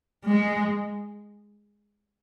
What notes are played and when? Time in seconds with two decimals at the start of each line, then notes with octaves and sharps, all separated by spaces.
0.25 G#3